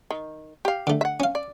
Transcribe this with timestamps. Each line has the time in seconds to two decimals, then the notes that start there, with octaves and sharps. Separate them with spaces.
0.11 D#3
0.65 G4 F5
0.87 D3 A3
1.01 E5 F#5
1.20 C#4 F5
1.35 D5